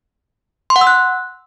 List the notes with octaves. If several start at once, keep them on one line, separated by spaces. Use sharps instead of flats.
C6
F#5
E6
F#6